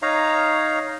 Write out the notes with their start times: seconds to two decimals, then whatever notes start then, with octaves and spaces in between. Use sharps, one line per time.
0.02 D#4 C#5 F5 A#5